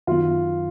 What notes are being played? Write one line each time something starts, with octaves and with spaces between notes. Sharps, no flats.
F#2 D#3 F#3 B3 F4